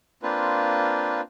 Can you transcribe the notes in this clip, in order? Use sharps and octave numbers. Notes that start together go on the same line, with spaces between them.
A#3 C4 D4 F4 B4